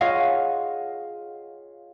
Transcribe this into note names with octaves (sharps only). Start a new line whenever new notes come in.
F4 G#4 C#5 D#5 F5 F#5